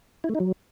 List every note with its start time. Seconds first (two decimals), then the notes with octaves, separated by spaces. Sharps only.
0.24 E4
0.29 A3
0.35 D#4
0.40 F#3